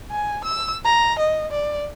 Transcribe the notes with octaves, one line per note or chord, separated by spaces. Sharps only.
G#5
E6
A#5
D#5
D5